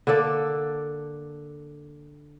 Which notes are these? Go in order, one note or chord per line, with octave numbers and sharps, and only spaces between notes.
D3 A#3 A4 D5